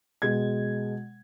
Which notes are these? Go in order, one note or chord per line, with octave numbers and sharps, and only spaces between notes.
B2 G#3 G#6